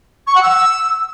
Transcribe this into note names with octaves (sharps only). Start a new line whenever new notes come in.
C#6
F#5
E6